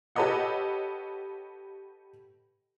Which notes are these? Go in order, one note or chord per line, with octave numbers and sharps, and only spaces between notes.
G4 A4 B4 C#5 D#5 F#5